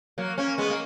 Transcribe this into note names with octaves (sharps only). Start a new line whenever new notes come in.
F#3 A#3
A#3 C#4
G#3 B3
A#3